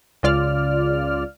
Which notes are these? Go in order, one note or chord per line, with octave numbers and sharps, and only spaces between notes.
C#2 C#3 F4 D5 F6